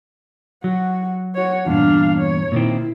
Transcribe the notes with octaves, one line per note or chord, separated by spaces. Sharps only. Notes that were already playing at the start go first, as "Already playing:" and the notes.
F#3 F#4
F#4 C#5
E2 G2 A#2 D4 F5
C#5
A#2 D#3 C4 E4